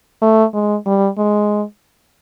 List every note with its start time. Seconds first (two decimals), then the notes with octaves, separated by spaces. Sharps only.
0.22 A3
0.54 G#3
0.86 G3
1.18 G#3